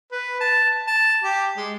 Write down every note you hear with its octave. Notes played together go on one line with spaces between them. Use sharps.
B4
A5
A5
G4
G#3